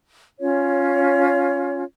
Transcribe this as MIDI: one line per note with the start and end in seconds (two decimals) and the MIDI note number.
0.39 1.83 61
0.39 1.83 65
0.39 1.83 73